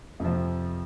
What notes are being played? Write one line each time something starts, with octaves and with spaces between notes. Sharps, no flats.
F2 C3 F3